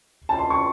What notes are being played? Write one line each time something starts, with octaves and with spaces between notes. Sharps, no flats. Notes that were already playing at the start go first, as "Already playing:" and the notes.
A5
C6
C#6